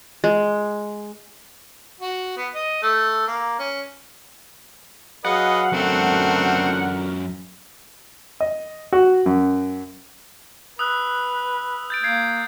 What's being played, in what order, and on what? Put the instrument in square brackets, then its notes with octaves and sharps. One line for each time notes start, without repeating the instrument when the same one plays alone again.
[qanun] G#3
[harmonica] F#4
B3
D#5
A3
A#3
C#4
[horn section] F#3 G#4 F5 [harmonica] B4 D#5 [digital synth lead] F#5
[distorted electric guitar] F#2 A4 [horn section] D3 F#3 A#4 [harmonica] A3 C4
[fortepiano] D#5
F#4
F#2
[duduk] B4 [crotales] D#6 E6 F#6
[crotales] G6 A6 D7
[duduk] A#3 [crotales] G6 G#6 C7